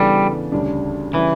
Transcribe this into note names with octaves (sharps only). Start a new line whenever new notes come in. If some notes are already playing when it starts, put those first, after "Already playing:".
Already playing: C#3 E3 G3 B3 D4 A4
D2 C#3 G3 D4
C#3 E3 G3 C#4